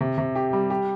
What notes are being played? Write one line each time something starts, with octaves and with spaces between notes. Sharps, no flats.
C3
C3
G4
G3
G4